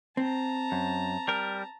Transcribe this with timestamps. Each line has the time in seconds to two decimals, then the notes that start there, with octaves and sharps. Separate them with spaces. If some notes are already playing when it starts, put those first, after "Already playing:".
0.17 C4 A5 A#5
0.72 F#2
1.28 G3 A#4